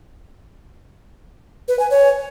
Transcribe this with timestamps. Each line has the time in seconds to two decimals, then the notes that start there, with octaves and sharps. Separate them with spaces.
1.68 B4
1.79 G#5
1.91 C#5